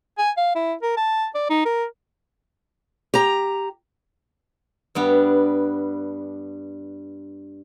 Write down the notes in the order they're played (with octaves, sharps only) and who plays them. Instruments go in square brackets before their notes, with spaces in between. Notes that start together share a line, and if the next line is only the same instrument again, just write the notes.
[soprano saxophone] G#5
F5
E4
A#4
A5
D5
D#4
A#4
[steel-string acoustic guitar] G4 A#5
[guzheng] G2 G3 B3 D4